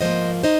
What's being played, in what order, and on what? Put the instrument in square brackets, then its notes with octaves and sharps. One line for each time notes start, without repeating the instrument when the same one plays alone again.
[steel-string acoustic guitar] G#2 F3 A#3 C5 D#5
D#4 C5 D#5